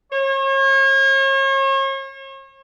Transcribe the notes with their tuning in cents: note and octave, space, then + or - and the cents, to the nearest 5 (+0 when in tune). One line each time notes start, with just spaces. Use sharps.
C#5 -40